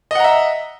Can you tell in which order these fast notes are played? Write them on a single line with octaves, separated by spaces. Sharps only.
D#5 F#5 A#5 E5